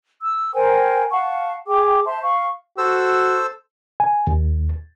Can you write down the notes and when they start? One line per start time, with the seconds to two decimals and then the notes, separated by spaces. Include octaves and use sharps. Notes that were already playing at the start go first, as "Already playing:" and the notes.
0.21 E6
0.54 A#4 C5 G5 G#5
1.11 F5 F#5 A5 C#6
1.67 G#4 G5 D6
2.05 C5 E5 A5 C6
2.23 F5 C#6
2.78 F#4 A4 C5 E6
4.00 G#5
4.27 D#2